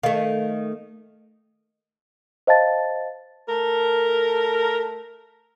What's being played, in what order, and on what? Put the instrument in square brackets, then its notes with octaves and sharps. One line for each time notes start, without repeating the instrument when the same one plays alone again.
[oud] D#3 A3 [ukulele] F5
[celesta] C5 D#5 F5 A5 A6
[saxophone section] A3 A4 A#4